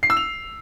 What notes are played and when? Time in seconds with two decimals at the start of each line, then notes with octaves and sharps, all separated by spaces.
0.03 C7
0.10 E6
0.17 F7